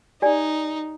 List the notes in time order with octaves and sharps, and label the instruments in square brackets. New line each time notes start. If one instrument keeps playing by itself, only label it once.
[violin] D#4 [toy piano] G4 D5 G#5